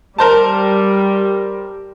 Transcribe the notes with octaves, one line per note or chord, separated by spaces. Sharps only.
G3 A#4 C5 A5